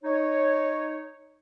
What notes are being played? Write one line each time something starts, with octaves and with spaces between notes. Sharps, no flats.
D#4 C#5